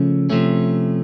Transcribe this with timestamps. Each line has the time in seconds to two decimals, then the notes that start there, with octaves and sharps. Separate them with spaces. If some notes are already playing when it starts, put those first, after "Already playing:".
Already playing: C#3 F3 A3 C#4
0.30 C3 F3 A3 C#4